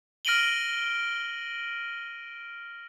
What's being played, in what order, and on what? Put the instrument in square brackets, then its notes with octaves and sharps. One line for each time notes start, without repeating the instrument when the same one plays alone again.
[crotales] F6 A#6 D7 D#7 F#7 G7